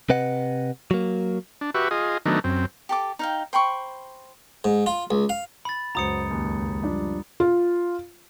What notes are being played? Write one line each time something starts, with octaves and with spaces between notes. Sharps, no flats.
C3 B4 D#5 F#5
F#3 A#3
D4
F#4 G4 B4 E5 C#6
F4 G#4 D#5
D#3 F#3 A3 B3 D4 D#4
F#2 C4
G4 A4 D6
D#4 F5 G5
C5 G5 B5 C#6
G#2
F4
C#2
F5
B5 A6
C#2 F#2 F#4 C5 A#5 D#6 C#7
D#2
F3 G3 D4
F4